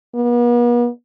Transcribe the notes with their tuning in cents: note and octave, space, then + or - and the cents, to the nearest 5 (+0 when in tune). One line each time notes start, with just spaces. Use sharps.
B3 -45